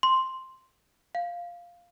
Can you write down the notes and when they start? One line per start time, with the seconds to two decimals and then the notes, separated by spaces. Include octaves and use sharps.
0.03 C6
1.15 F5